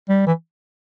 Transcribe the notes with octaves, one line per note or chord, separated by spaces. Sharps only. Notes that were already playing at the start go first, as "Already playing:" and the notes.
G3
E3